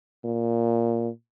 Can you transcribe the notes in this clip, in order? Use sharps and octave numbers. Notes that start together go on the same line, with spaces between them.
A#2